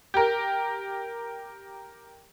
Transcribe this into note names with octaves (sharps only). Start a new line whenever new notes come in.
G4 A#4